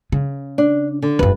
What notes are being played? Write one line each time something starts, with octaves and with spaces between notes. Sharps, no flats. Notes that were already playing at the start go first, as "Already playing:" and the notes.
C#3
D4
D3
F1 G2 B4